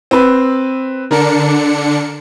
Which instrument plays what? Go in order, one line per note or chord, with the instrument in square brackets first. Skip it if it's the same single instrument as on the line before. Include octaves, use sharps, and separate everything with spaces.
[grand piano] C4 B4
[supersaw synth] D3 D4 C#7 [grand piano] A#4